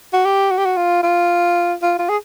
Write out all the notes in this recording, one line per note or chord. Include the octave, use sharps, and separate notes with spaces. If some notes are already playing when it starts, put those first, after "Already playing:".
F#4
G4
F#4
G4
F#4
F4
F4
F4
F4
G#4